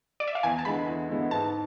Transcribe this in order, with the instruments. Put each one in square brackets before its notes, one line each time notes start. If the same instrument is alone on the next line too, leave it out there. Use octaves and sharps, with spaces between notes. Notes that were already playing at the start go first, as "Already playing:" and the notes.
[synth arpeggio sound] D5
E5
F5
[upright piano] E2 [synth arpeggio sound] G#5
[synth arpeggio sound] A5
[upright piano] D3 G#3 B3 E4 [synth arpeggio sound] B5
[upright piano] E2
D3 G#3 B3 E4
[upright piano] G#2 [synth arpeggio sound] A5